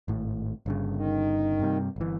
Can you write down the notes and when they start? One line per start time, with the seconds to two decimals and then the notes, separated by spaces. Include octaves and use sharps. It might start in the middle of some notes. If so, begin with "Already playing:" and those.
0.08 G#1 A2
0.66 G1 G2 C#3
0.95 D#3
1.60 G2 C3 G3
1.96 G1 E3